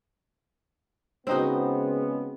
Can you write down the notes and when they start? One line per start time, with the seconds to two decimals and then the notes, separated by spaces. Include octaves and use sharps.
1.27 C#3 G#3 B3 C4 D#4 F#4